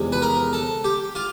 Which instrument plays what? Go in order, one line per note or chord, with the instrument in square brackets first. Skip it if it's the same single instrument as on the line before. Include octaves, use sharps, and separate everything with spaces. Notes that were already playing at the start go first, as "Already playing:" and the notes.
Already playing: [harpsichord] E2 C3 F3 G#3
B4
A#4
A4
G4
F4